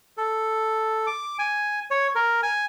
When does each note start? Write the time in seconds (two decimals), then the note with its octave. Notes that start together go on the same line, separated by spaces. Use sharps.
0.17 A4
1.07 D6
1.39 G#5
1.90 C#5
2.15 A#4
2.43 G#5